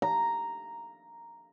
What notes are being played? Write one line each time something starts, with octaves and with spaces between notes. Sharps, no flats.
A#5